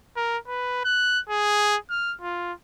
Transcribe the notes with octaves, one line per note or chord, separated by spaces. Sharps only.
A#4
B4
F#6
G#4
F6
F4